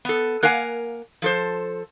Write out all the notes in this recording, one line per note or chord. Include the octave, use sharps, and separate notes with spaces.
B3 A4
A#3 A#4 F5 F#5 G#5
F3 A4 C5